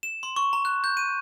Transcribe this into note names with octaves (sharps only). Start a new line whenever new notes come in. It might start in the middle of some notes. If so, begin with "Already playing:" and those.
E7
C6
C#6
A#5
F#6
G6
D#7